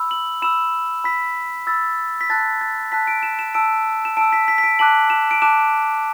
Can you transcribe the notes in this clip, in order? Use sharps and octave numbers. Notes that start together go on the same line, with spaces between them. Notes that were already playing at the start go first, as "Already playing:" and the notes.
Already playing: B5 E6
F#7
B5 E6 E7
B5 E6 B6
B5 E6 A6
B6
A5 F#6 A6
A6
A5 F#6 B6
D7
E7
E7
A5 E6 D7
E7
A5 E6 D7
B6
B6
B6
D7
A5 D6 F#6 F#7
E7
D7
A5 D6 F#6 E7